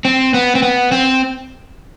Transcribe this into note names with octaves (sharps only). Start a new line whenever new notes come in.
C4
B3
C4
B3
C4